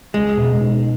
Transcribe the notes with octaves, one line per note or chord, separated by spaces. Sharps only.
C#2 G#3
B2
D#4